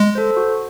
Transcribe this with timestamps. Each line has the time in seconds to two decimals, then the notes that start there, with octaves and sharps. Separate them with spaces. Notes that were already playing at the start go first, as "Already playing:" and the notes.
Already playing: G#3
0.15 A4 C5
0.37 F#4